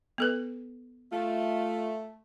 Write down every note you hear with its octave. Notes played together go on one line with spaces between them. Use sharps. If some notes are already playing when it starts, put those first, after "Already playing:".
B3 A4 B4
A3 F4